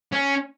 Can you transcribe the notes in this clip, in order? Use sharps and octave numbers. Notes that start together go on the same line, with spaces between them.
C#4